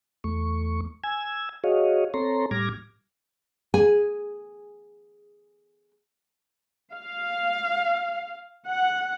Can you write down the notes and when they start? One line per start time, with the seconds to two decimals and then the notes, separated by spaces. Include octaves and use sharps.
0.24 E2 A3 C#6
1.04 G#5 E6 G#6
1.64 F#4 G#4 C#5 D#5 F5
2.14 C4 A4 C#5 A#5 C6
2.51 A2 G3 D6 F6 G#6 A#6
3.74 G#4 G#5
6.94 F5
8.68 F#5